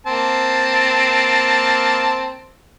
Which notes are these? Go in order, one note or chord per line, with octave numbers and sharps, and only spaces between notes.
A#3 C4 A5